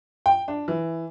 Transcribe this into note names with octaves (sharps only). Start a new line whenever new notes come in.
G5
D4
E3